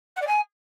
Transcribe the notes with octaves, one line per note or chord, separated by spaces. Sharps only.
F#5
D5
G#5